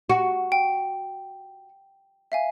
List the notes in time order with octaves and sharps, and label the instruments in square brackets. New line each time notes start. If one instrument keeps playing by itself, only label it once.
[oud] F#4
[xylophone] G5
E5 F5 G#5